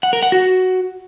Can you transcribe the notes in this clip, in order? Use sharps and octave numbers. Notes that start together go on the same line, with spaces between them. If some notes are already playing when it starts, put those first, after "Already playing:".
F#5
A#4
F#5
F#4